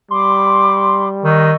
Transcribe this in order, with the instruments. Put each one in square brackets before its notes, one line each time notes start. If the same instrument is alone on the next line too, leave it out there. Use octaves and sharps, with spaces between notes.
[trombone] G3 [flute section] B5 D6 D#6 [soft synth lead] C6
[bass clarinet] D#3 [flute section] D#5 C#6 E6